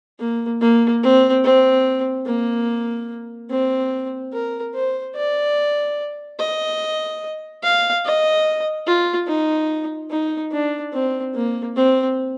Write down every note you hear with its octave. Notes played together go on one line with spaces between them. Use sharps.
A#3
A#3
C4
C4
A#3
C4
A#4
C5
D5
D#5
F5
D#5
F4
D#4
D#4
D4
C4
A#3
C4